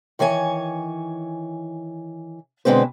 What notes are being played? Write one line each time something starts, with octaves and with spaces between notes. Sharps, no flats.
D#3 E3 C#5 G#5
B2 D3 G#3 C4 B4